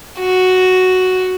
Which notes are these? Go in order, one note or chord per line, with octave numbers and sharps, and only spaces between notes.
F#4